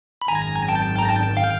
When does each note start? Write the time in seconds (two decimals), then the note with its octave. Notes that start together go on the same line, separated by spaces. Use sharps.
0.22 B5
0.28 G#1 F#2 D#3 G#5 A#5
0.68 G5 A5
0.99 A#5
1.09 G5 A5
1.37 F5 G5